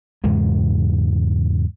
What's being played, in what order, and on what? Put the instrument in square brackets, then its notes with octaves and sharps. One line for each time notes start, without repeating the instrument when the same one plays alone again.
[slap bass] E2 G#2 C#3 G#3